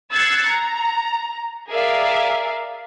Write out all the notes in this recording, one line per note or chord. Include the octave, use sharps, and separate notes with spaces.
E6 F#6 G#6 A6 C7 C#7
A#5
G#4 A#4 D5 E5 F5